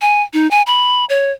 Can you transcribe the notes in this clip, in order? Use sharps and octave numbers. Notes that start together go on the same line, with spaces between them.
G#5
D#4
G#5
B5
C#5